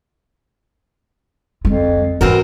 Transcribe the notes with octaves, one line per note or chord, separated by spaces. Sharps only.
F2 D3 G#3
G#2 E3 G#3 C4 F#4 A#4